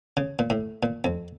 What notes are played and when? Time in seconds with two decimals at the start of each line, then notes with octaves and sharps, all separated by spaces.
0.17 C#3
0.39 A#2
0.50 A2
0.83 A#2
1.04 F2